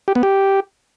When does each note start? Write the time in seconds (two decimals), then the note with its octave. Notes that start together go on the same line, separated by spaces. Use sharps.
0.08 G4
0.15 B3
0.23 G4